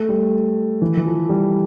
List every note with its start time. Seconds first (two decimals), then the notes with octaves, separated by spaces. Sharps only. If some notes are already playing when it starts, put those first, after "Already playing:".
Already playing: A3
0.09 G3
0.82 E3
0.97 E3
1.05 F3
1.29 G3